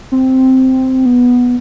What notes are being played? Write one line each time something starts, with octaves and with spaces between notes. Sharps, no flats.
C4
B3